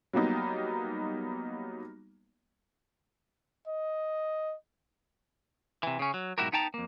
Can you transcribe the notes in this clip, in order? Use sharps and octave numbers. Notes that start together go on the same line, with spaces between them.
F#3 G3 A#3 B3 D#4
D#5
C3 E3
C#3 C#4
F#3
B1 G#2 E4 F#4 G4 A#4
B3 D#4 G5 A5 A#5
F2 A#3